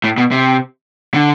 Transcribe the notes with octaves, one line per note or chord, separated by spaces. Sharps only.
A2
B2
C3
D3